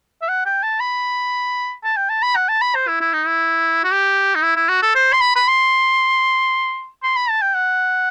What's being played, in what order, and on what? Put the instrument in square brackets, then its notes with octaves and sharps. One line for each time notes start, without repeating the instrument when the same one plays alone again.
[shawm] E5
F#5
G5
A5
B5
A5
G5
A5
B5
F#5
A5
B5
C5
E4
E4
D#4
E4
F#4
G4
D#4
E4
E4
F#4
A4
C5
C6
B5
B5
C6
C6
B5
A5
G5
F#5